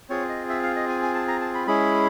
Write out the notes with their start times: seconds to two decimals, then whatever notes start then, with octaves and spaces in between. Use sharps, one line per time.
0.09 C4 F4 G#4 C#5
0.29 D#5
0.49 E5
0.63 F5
0.76 D#5
0.89 G#5
1.02 G#5
1.15 A5
1.28 A#5
1.41 A5
1.55 B5
1.67 G#3 C#4 E4 G#4 B5